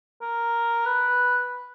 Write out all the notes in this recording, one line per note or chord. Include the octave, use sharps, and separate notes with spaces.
A#4
B4